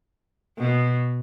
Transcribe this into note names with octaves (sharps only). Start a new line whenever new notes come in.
B2